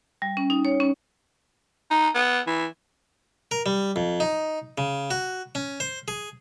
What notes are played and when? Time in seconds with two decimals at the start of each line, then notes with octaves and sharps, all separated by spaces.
0.22 G3
0.37 C#4
0.50 D#4
0.65 C#5
0.80 C#4
1.91 D#4
2.15 B3
2.47 E3
3.51 A#4
3.66 G3
3.96 F2
4.20 D#4
4.78 C#3
5.11 F#4
5.55 C#4
5.80 C5
6.08 G#4